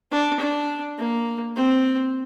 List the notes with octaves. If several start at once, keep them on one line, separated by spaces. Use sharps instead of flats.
D4
D4
A#3
C4